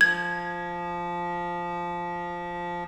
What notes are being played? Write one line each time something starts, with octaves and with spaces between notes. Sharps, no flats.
F3 G#6